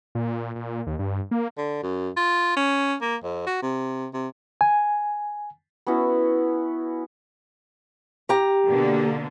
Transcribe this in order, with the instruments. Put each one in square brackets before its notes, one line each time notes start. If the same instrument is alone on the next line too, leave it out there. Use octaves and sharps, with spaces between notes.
[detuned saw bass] A#2
A#2
D#2
G2
A#3
[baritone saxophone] D3
F#2
F4
C#4
A#3
F2
F#4
C3
C3
[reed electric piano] G#5
[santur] B3 C#4 E4 F#4
[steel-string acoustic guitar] G4 A#5
[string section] B2 D3 A#3